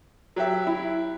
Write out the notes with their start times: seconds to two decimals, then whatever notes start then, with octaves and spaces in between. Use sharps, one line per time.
0.36 F#3 G4 E5
0.67 E4